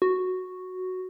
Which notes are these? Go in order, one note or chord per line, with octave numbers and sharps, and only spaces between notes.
F#4